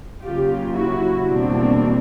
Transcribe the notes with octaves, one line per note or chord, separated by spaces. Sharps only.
C#3 F#3 A#3 F4 G4
E4 F#4
E2 B2 G3 A#3 C4 D4